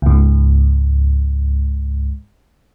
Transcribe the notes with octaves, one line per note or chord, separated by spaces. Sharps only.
C#2 G#2